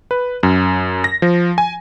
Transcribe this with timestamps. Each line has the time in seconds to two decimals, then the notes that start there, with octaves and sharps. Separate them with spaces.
0.11 B4
0.43 F#2
1.04 A#6
1.22 F3
1.58 G#5